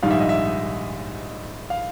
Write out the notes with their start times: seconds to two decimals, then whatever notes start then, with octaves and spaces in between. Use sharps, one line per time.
0.03 A#1 G#2 D#3 G3 F5
0.11 E5
0.20 D#5
0.29 E5
1.70 F5